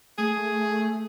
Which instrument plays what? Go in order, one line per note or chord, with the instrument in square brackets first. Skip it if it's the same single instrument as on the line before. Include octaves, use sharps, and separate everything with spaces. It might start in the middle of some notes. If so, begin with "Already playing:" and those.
[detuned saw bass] A3 [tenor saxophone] G#4